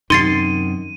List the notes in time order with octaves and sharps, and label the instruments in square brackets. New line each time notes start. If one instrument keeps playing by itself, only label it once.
[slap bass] F#2 C3 D#3 [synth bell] D#4 [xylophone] C6 A6 C7 [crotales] D#7